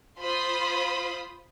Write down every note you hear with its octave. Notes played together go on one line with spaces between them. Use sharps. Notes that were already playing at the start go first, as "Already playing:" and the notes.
F4 C5 B5 C6 D#6